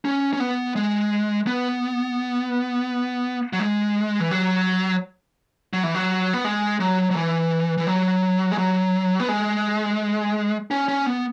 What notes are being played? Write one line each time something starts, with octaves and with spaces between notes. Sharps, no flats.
C#4
C#4
B3
G#3
B3
F#3
G#3
E3
F#3
F#3
E3
F#3
B3
G#3
F#3
F#3
E3
E3
F#3
G#3
F#3
B3
G#3
C#4
C#4
B3